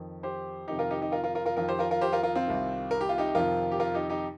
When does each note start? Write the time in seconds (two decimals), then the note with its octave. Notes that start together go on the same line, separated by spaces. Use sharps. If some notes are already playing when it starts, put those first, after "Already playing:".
Already playing: F2 D#3
0.23 G4 C5
0.68 F2 C3 D#3 D#4 G4
0.79 F4 A#4
0.90 D#4 G4
1.01 D#4 G4
1.12 F4 A#4
1.24 F4 A#4
1.35 F4 A#4
1.46 F4 A#4
1.57 F2 D#3 F4 A#4
1.68 G4 C5
1.79 F4 A#4
1.91 F4 A#4
2.01 G4 C5
2.13 F4 A#4
2.23 F4 A#4
2.35 C4 F4
2.47 C2 C3 D#3
2.91 A#4
3.01 G4
3.09 F4
3.18 D#4 G4
3.35 F2 C3 D#3 F4 A#4
3.72 G4
3.80 F4 A#4
3.94 D#4 G4
4.09 D#4 G4